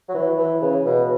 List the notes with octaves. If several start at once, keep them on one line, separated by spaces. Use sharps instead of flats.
F#3
E3
E3
C#3
B2